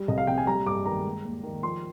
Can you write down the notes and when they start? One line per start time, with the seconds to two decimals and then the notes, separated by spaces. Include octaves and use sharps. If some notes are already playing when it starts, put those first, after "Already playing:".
Already playing: G3
0.08 C2 D#5
0.18 F5
0.27 C3 G5
0.38 G#5
0.47 G3 A#5
0.66 G2 D6
0.85 D#3 A#5
1.05 G#3
1.25 D#2
1.43 D#3
1.63 F3 C6